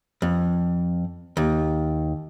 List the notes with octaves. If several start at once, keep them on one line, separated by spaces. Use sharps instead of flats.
F2
D#2